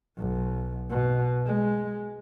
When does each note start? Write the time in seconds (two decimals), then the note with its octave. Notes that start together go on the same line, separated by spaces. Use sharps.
0.18 B1
0.90 B2
1.46 G#3